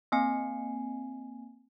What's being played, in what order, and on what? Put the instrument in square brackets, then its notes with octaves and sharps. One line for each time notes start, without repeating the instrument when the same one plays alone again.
[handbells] A#3 C4 G#5 C7